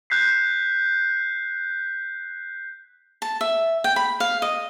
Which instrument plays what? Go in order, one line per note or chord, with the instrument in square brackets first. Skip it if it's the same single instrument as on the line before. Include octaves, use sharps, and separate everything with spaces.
[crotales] F#6 G6 B6 C7
[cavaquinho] A5
E5
G5
B5
F5
D#5